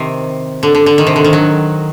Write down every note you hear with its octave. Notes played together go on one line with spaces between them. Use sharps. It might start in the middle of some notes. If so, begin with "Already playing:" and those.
Already playing: C3 D#3
D3
D3
D3
D#3
C3
D3
D#3
F#3